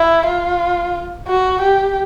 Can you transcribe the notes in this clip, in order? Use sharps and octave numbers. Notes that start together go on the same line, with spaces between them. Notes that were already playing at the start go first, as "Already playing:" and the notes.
Already playing: E4
F4
F#4
G4